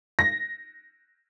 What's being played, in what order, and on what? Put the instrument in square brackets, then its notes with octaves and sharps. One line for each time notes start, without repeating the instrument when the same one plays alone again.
[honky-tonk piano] A#6